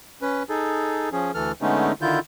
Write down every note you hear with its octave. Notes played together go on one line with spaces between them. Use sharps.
C#4 B4
D#4 G#4 A4
F3 C#4 G#4
D2 E3 A4 F6
D3 G#3 A3 B3 C#4 D#4
D3 D#3 E4 F4 G6